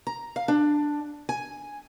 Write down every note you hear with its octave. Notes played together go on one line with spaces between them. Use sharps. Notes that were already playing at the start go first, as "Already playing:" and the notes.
A#5
F5
D4
G#5